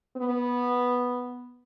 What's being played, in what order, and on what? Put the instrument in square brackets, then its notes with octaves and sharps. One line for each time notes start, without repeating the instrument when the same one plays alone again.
[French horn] B3